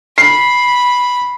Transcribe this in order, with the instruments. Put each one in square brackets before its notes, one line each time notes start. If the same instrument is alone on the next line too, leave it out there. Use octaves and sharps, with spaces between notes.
[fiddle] B5 [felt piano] C7